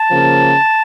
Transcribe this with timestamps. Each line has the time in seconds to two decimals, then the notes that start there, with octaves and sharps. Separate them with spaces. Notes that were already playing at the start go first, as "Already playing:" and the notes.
Already playing: A5
0.09 C#3 F3 A#3